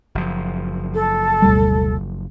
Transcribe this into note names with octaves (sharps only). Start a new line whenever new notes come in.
F#1 F3
A4
D2 B2 G3